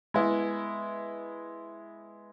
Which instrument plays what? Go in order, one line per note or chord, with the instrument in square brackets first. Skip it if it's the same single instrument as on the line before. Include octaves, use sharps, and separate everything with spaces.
[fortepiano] G#3 B3 E4